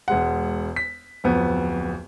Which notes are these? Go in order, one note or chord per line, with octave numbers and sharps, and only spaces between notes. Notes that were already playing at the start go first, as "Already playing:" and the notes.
E1 G#3 F#5
B6
D1 F2 B3